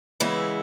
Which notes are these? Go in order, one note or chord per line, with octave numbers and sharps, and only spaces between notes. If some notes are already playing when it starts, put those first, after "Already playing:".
C#3 E3 G#3 B3 E4